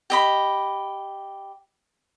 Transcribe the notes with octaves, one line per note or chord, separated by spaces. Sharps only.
G4 D#5 B5